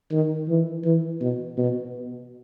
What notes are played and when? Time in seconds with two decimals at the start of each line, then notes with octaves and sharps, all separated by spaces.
0.12 D#3
0.49 E3
0.85 E3
1.21 B2
1.57 B2